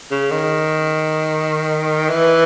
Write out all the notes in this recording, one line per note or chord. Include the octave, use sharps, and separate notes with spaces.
C#3
D#3
E3